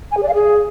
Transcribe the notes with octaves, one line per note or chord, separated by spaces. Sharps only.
G#5
G#4
D5
F5
G#4